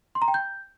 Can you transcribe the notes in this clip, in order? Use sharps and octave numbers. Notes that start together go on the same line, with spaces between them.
C6
A#5
G5
G6